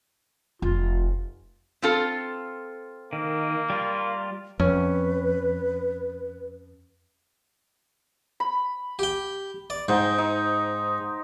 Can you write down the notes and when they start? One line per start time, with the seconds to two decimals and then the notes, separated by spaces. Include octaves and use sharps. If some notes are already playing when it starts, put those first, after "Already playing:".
0.62 F1 F4
1.82 C4 F4 A4
3.13 D#3 A#3
3.70 G3 F4
4.59 F2 C#4 B4
8.40 B5
8.99 G4 G5
9.70 D5
9.88 G#2 D#4 C5 G5
10.18 D#4